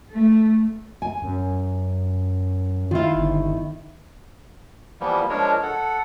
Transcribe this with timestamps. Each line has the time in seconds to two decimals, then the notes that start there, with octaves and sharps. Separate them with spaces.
0.11 A3
1.02 G#5
1.22 F#2
2.91 D#3 E4 F4
3.15 G1
5.01 E3 F3 G3 A#3 B3
5.29 F3 G#3 D4 A#4 C#5
5.63 A4 F#5